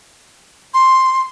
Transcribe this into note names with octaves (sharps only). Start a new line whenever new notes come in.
C6